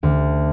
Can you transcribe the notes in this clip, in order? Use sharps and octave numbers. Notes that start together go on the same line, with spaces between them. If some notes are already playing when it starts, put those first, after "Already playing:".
D2